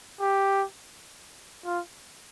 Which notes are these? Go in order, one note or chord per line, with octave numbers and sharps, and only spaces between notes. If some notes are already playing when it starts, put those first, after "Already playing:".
G4
F4